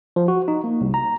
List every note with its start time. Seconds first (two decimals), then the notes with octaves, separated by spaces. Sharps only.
0.16 F3
0.28 F#4
0.48 D#4
0.64 A#3
0.81 C2
0.94 A#5